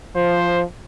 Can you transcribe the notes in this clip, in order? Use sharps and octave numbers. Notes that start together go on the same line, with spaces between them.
F3 C5